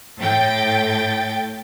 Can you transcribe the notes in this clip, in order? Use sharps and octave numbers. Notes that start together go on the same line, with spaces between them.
A2 G5 A6